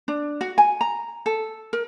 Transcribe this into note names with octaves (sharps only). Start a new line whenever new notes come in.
D4
F#4
G#5
A#5
A4
A#4